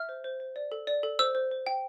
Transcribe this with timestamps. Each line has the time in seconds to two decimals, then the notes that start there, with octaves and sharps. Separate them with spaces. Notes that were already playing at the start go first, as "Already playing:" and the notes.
Already playing: E5 F6
0.09 C5
0.24 C5
0.40 C5
0.56 D5
0.72 A4
0.87 D5
1.03 A4
1.19 C5 E6
1.35 C5
1.51 C5
1.67 G5